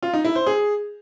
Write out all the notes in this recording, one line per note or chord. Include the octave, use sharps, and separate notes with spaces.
F4
D#4
E4
C5
G#4